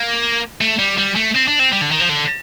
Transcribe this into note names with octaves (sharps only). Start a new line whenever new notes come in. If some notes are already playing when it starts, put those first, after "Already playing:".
Already playing: A#3
A3
G3
G3
A3
C4
D4
C4
G3
D3
D#3
F3
D3